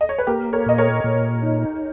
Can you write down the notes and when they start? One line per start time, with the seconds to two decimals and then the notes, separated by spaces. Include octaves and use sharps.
0.01 D#5
0.09 C#5
0.19 B4
0.27 A#3 G4 A#4
0.53 A#4 C#5
0.66 A#2 D#5
0.78 A#4 C#5
1.04 A#2
1.43 D#4